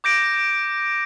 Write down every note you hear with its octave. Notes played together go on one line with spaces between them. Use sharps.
D6 G6 A#6 D7